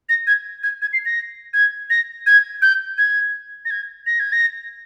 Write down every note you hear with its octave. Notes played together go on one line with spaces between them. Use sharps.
A#6
G#6
G#6
G#6
C7
A#6
G#6
A#6
G#6
G6
G#6
A#6
G#6
A#6
G#6
A#6